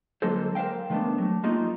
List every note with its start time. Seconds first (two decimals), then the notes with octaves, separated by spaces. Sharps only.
0.22 D3 F#3 G#3 A#3 A4 C5
0.55 A#4 C5 E5 F5 G5
0.90 D#3 G#3 A3 B3 D4
1.18 F#3 A3
1.43 G#3 A#3 C#4 D#4 F4 G4